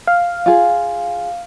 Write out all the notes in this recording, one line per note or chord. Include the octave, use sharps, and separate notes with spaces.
F5
F4 G#4